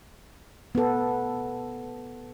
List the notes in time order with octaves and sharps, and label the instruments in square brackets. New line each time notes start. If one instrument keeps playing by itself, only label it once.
[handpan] B3 A4